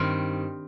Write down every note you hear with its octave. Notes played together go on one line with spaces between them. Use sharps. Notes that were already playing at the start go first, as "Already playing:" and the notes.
Already playing: G2 D#3 C4